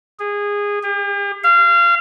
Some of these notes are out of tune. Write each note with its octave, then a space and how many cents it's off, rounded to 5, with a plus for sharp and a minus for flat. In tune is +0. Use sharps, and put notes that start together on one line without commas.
G#4 -20
G4 +45
F5 -25